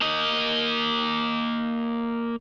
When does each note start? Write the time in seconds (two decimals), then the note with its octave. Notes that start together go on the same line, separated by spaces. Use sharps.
0.01 A#3 D#5